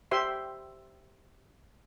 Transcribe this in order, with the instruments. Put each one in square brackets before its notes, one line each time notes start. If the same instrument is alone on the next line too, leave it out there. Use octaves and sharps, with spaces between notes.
[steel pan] G4 C5 E5 C6